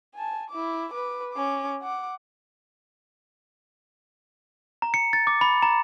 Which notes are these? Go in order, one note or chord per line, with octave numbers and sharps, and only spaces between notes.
G#5 A5
E4 D6
B4 D6
C#4 D6
F#5 D6
A#5
C#7
A6
D6
B5
A#5